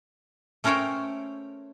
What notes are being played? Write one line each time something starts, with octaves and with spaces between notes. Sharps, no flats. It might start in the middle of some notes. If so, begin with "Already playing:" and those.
A3 C#4 A#4 C5 C#5 G5